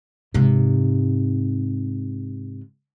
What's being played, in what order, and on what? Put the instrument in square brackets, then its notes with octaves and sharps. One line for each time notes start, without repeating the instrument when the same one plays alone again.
[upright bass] G#2 C3